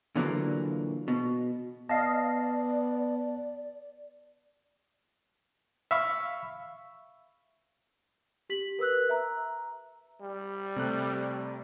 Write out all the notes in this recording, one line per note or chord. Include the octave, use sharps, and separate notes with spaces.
A#2 D3 E3 F#3 A3 A#3
B2
B3 D5 D#5 F5 A5
E5 F5 B5 C#6 E6
G4 B6 F#7
A#4 B4 E6 F#6
E5 A#5
G3
C3 A3 F#6